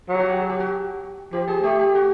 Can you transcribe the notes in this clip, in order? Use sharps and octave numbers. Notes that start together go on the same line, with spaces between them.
F#3
G4
F#4
G4
G#4
G4
F#4
F3 G4
G#4
A3 G4
G4
F#4